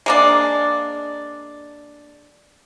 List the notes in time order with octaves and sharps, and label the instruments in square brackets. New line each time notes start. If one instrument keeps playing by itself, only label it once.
[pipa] G#3 A#3 D4